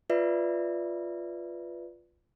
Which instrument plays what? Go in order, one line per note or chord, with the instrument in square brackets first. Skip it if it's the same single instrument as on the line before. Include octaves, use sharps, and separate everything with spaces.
[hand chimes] F4 B4 D5 E5